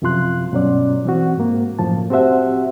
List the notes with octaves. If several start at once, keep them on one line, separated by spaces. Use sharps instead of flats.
F#2 C3 F3 F4 C6 F#6
G2 B2 F#3 C#4 D5
E3 C4 F#4
G#2 A#3
F#2 A2 F3 A5
C4 F#4 G4 C5 E5 F#5